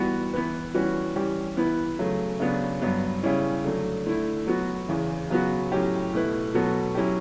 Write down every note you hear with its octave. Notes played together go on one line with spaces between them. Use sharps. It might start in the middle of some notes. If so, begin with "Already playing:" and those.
Already playing: E3 G3 B3 F#4
E3 B3 E4 B4
E3 G3 C#4 F#4 B4
E3 G3 C#4 G4
E3 B3 E4 B4
C#3 F#3 A3
C#3 F#3 B3 D4
G2 F#3 B3
C#3 G3 C#4 E4
D3 F#3 A3
D3 A3 E4
F#3 B3 F#4
E2 C#3 E3
C#3 F#3 B3 F#4
A2 F#3 C#4 G4
B2 A3 E4 B4
B2 F#3 B3 F#4 A4
F#3 C#4 E4 G4